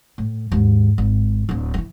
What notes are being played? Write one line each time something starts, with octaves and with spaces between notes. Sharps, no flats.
A2
D#2 G#2
G#1
D1 D2
E3 F3